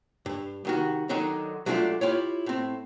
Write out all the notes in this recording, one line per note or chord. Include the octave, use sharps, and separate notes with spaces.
G2
C2 D#3 F#4
D3 D#3 F#3 D4 D#4
F#3 G#3 A3 D4 F4
E4 F4 G4 C#5
A2 C4